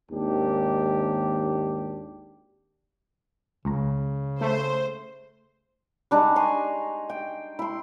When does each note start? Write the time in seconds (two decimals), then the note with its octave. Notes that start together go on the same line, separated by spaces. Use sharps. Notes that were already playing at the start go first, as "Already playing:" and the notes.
0.11 G#1 D#2 D4 G4
3.65 C#2 C#3 A#5
4.41 A3 C5
6.11 G3 D4 D#4 G#4
6.36 G#5 A#5 C6 C#6
7.09 G5
7.59 E4 C6